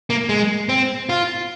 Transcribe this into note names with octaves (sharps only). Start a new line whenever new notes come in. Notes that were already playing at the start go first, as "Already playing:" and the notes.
A#3
G#3
C4
F4